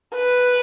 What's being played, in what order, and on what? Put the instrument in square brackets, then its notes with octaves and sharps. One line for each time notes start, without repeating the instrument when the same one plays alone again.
[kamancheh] B4